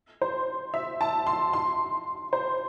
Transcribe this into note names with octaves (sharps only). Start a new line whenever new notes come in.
C5
E5
A5
C6
C6
C5